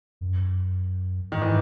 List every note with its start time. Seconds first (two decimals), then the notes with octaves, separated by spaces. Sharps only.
0.21 F#2
1.32 G#2 D#3
1.42 E3